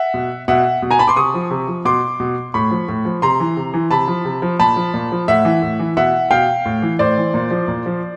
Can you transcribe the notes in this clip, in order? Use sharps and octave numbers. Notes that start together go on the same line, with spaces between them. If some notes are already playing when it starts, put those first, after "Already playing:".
Already playing: E5 F#5
B2
B2 E5 F#5
B2
G#5 A#5
A5 B5
C6 D6
C3 C#6 D#6
F3
C3
F3
B2 C6 D6
B2
A2 B5 C#6
F3
A2
F3
C3 A#5 C6
E3
C3
E3
C3 A5 B5
F3
C3
F3
A#2 A5 B5
F3
A#2
F3
A2 E5 F#5
E3
A2
E3
B2 E5 F#5
B2 F5 G5
A2
E3
A2 C5 D5
E3
A#2
F3
A#2
F3